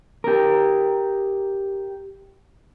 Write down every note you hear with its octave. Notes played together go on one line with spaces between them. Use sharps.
G4 A#4